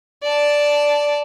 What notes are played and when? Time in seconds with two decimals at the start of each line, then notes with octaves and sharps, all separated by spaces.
0.23 D5 A5